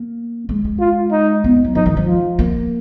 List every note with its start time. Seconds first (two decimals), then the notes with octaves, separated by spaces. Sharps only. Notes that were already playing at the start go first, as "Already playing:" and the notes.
Already playing: A#3
0.49 G#3
0.65 G#3
0.80 F4
1.12 D#4
1.44 B3
1.64 F#3
1.75 F3 D#4
1.86 D#3
1.97 F3
2.07 F4
2.39 A#3